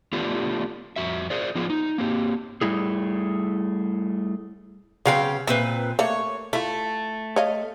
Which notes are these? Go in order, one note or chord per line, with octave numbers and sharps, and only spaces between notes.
A3 B3 D4 F4 G4
F2 F#4 E5
G#4 A#4 C5 D5
F3 B3 F4 G#4
D#4
A#3 C4 G4
G3 A3 E4 G#4
C#3 F#3 B3 C4 F5 G5
A#2 C4 E4 B4
A3 A#3 C#5
A3 E4 F4
C#5 D#5 F5